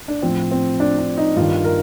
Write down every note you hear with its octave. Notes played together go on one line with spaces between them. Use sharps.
D4
A2 F3 C4
C4
D4
D4
D#4
G2 D#3 F4
A#4